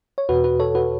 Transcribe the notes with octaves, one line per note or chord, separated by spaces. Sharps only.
C#5
E2 B2 F#4 B4
F#4 B4
A4 C#5
F#4 B4